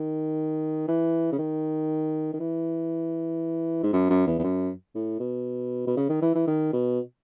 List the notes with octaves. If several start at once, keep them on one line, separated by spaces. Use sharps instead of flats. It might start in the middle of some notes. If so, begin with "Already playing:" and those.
Already playing: D#3
E3
C#3
D#3
D#3
E3
G#2
F#2
F#2
E2
E2
F#2
A2
B2
B2
C#3
D#3
E3
E3
D#3
B2